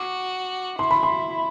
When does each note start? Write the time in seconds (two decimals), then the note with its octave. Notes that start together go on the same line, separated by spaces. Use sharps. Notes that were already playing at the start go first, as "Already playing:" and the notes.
Already playing: F#4 D6
0.79 E4 C6
0.91 B5
1.03 C6